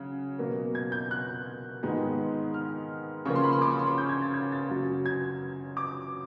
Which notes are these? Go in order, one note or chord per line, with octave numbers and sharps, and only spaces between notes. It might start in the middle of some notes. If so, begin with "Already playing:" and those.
Already playing: C#3 F#3
B2 F#3 A#3
G#6
G6
F#6
G#2 D#3 G#3 B3
F6
C#3 F3 A#3 C#6
C6
B5
C6
D6
C#6
C6
C#6
G6
G#6
A6
G#6
A6
F#2 C#3 F#3
G#6
D6